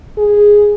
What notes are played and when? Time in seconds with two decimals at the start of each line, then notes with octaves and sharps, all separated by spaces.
0.18 G#4